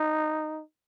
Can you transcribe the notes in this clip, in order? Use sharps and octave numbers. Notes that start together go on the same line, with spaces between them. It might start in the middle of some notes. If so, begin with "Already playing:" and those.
Already playing: D#4